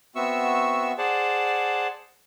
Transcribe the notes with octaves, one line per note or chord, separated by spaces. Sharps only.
B3 C4 F#4 E5 C#6 E6
G#4 C5 D5 F#5 A5